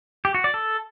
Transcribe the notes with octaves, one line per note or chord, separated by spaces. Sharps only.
G4
F#4
D5
A4